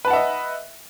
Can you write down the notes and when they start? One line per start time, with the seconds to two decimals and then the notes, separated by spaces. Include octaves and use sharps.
0.05 B4
0.08 A5
0.10 F#5
0.13 E5
0.16 D#5